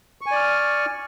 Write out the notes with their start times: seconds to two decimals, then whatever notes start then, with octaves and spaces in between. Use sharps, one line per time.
0.21 C#6
0.26 G#5
0.31 D5
0.36 F6